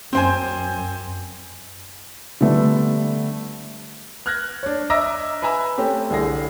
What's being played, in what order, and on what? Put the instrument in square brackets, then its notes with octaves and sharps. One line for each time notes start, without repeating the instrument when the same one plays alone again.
[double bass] F#2 [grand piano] C4 C5 G#5
[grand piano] D3 G3 A3 B3
F6 F#6 G#6 A#6
D4 C#5
D#5 E5 A#5 D6 E6 A#6
B4 E5 G#5 A#5 E6
A3 C4 C#4 G4
C2 D3 G#4 A#6